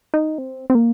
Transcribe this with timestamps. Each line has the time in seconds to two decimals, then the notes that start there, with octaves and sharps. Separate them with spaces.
0.14 D#4
0.38 C4
0.70 C4
0.75 A#3